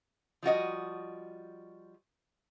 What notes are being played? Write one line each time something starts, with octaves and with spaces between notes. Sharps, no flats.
F3 G3 F#4 D#5